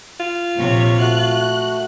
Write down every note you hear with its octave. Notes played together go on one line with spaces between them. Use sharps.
F4
A#1 C3 C#5
A3 F#4 F#6